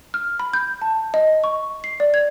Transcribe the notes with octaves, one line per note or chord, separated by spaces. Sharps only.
F6
B5
G6
A5
D#5
C#6
C7
D5
G#6